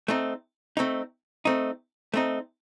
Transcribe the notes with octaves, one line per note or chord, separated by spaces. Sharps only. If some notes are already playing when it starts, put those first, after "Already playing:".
A3 C4 D#4
A3 C4 D#4
A3 C4 D#4
A3 C4 D#4